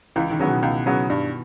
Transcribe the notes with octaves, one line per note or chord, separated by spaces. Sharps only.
C#2 E3
D#3
C#3 F#3 B3
B2
C#2
C#3 F#3 B3
G2